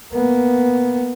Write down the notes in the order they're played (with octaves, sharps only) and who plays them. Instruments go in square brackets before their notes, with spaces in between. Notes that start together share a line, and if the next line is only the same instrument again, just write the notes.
[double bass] A#3 B3